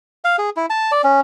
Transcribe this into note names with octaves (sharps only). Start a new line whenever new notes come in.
F5
G#4
E4
A5
D5
C#4